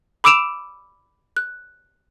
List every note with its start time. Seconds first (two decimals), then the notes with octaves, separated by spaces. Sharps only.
0.24 B5 D6 E6 D7 E7 F7
1.37 F#6